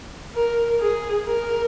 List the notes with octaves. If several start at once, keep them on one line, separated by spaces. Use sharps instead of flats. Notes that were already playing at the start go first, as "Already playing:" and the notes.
A#4
G#4
A#4